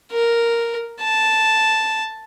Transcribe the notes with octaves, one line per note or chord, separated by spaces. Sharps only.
A#4
A5